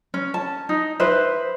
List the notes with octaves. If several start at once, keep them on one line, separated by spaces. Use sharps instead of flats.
C#4
A5
D#4
B4 C5 E5